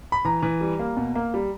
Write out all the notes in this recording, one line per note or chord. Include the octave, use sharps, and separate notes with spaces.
B5
E3 A#5
E3
G3
A#3
B2
A#3
G3